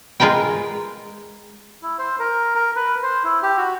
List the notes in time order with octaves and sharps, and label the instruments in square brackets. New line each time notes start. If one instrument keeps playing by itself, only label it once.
[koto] G#3 F4 A#4 B4 G5
[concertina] E4
C5
A#4
A#4
B4
C5
E4
G4
F#4